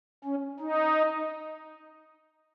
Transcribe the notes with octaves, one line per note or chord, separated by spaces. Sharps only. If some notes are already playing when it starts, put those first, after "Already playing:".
C#4
D#4